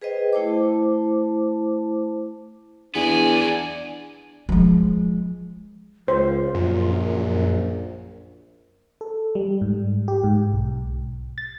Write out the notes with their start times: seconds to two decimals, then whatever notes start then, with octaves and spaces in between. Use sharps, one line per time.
0.02 G#4 B4 C5 D#5 G5
0.33 A3 E4 C5 A5 D6
2.95 E2 B3 D4 D5 G#5
4.49 F3 G#3
6.08 C#2 F4 C5
6.55 A#1 F#2
9.01 A4
9.35 G3
9.61 G#2
10.08 G4
10.24 G#2
10.53 B1
11.38 A6